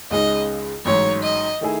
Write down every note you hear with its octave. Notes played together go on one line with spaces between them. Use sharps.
C#2 C#3 G#3 D#4 D#5
A1 G#2 F#3 C#5
D#5
D#3 A3 E4 G#4